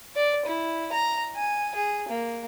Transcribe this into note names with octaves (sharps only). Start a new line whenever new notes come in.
D5
E4
A#5
G#5
G#4
A#3